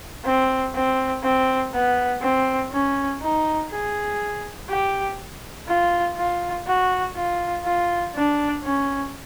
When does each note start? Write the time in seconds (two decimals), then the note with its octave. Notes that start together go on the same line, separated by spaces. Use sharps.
0.25 C4
0.75 C4
1.23 C4
1.73 B3
2.21 C4
2.72 C#4
3.21 D#4
3.70 G#4
4.69 G4
5.67 F4
6.17 F4
6.66 F#4
7.15 F4
7.64 F4
8.15 D4
8.63 C#4